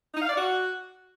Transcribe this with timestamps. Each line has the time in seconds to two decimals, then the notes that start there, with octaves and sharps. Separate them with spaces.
0.14 D#4
0.22 F5
0.30 D5
0.37 F#4